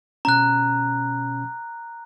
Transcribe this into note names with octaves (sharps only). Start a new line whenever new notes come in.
B2 C#4 A#5 F#6